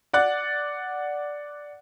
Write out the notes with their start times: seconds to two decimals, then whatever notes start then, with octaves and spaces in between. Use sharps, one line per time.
0.13 D5 F#5 F#6 A6